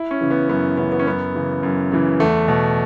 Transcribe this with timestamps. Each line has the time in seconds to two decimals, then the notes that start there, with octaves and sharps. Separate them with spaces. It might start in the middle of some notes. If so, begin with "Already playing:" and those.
Already playing: E4
0.11 C#4
0.21 C#3 E3
0.30 B3
0.49 F#2 B3
0.77 C#3 E3 B3
0.92 B3
0.99 C#4
1.06 F#2 B3
1.35 C#3 E3
1.63 F#2
1.92 C#3 E3
2.20 E2 A3
2.48 B2